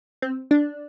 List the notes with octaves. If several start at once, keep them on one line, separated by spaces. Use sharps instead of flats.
C4
D4